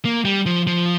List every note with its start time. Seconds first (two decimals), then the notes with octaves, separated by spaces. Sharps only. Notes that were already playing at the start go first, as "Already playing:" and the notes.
0.05 A#3
0.25 G3
0.46 F3
0.67 F3